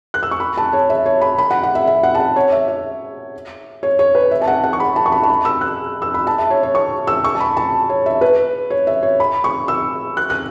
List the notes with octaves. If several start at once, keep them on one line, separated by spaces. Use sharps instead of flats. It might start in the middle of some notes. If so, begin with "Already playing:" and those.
F#6
E6
C#6
B5
A5
C#5
E5
C#5
B5
B5
F#5
F#5
E5
E5
F#5
A5
F#5
C#5
E5
E5
C#5
C#5
B4
E5
A5
F#5
F#5
C#6
B5
A5
C#6
B5
A5
B5
E6
F#6
E6
B5
A5
E5
C#5
C#5
C#6
E6
C#6
A5
B5
A5
C#5
E5
B4
C#5
E5
C#5
B5
C#6
E6
F#6
F#6